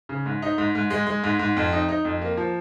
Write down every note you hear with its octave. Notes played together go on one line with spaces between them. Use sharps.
C#3
G#2
D#4
G#2
G#2
G#3
G#3
G#2
G#2
F2
D#4
D#4
F2
A#3
F3